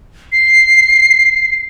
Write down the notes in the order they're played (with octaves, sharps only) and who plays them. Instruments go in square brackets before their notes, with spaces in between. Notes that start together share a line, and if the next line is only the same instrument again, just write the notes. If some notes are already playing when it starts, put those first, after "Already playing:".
[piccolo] C7